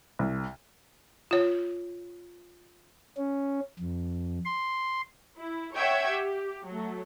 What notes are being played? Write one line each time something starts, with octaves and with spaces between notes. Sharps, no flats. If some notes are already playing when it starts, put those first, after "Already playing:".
C2
F4 C#5
C#4
F2
C6
E4
C#5 E5 F#5 G5 C#6 G#6
G4
F#3 A3